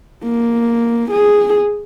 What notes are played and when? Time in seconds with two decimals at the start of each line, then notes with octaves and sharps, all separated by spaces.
0.24 A#3
1.11 G#4